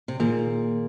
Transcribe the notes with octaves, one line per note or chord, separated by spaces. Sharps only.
C3
A#2 D#3 A#3 F4 G#4